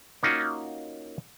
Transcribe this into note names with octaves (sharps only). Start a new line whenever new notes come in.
A#3 C#4 D#4 F4 F#4